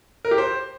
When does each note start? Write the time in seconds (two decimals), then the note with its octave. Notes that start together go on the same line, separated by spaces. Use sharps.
0.25 A#4
0.31 G4
0.38 C5